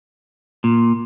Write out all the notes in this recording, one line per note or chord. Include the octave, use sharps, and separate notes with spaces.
A#2